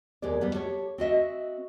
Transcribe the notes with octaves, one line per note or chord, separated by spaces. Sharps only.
D#2 G#3 B3 G4 D5
G3 B3
G4 A4 C#5
C4 F#4 D#5 E5